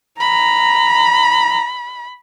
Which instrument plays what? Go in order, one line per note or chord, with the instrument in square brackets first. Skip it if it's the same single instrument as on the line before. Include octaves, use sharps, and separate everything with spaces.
[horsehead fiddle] A#5 [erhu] B5